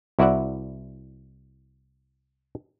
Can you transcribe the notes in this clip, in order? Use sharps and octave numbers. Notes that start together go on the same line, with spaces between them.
C2 E4 F#4 D5 E5 F#5